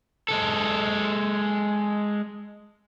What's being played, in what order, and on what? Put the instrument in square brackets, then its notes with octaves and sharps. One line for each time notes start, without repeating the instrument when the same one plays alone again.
[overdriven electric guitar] G#3 A4